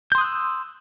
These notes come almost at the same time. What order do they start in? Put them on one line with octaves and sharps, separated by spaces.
G6 C6 D#6 F#6 E6